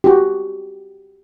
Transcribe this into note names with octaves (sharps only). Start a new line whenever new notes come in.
F#4 G4